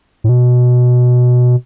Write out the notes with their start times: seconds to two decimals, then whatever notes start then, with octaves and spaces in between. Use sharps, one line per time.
0.24 A2
0.29 B2